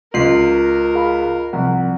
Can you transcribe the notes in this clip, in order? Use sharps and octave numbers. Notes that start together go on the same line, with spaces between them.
C#2 F4 A#4 C7
G#4 F5 B5
C2 F3 F#5